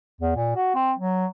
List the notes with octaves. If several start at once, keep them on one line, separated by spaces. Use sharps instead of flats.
E2
A#2
F#4
C4
F#3